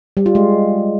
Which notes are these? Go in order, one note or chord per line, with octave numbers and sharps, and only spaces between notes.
G3
F4
G#3